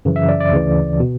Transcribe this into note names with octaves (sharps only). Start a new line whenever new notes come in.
F#2 C#3 E3
E5
D5
D5
D2 C#3 E3
B2